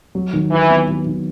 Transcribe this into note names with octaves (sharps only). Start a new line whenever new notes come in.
F#3
D#3
E3 E4
B3
F#3
D#3